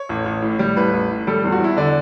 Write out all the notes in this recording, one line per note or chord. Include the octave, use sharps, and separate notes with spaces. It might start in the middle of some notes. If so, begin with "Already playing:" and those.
Already playing: C#5
A1
A1
A2
G3
A1 B4
A1
A2
G3 A4
E2 A4
F#4
E2 E4
D3 D5